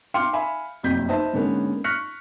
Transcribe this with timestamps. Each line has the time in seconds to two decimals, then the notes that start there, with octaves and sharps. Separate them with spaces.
0.14 F5 G5 C6 D6 F6 C#7
0.33 E5 F5 G#5 B5
0.83 F#1 B1 F2 C3 G6 B6
1.08 D#4 B4 C5 D#5 E5 A5
1.33 G#2 D3 G#3 A#3 B3 C#4
1.84 C#6 F6 F#6 A#6 B6 C#7